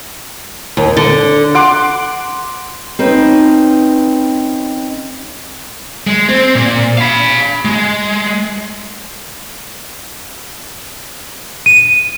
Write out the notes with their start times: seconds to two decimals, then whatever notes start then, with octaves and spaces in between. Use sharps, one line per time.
0.77 D#2
0.97 D3
1.55 F#5 C6 D6
2.99 C4 C#4 D#4 B4
6.07 G#3
6.28 C4
6.55 A#2
6.98 F5 B5
7.65 G#3
11.66 D#7